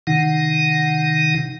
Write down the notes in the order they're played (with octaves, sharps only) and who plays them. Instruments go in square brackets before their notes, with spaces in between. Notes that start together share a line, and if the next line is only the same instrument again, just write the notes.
[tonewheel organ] C3 D#3 D#4 F#5